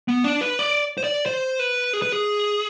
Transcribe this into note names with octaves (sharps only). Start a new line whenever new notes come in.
B3
D4
B4
D5
C5
D5
C5
B4
G#4
B4
G#4